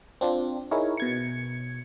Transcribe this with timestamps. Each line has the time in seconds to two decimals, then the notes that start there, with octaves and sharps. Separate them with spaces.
0.21 C4 D4 F4
0.71 D#4 E4 G#4 A#4 C#5
0.97 B2 G#6 C#7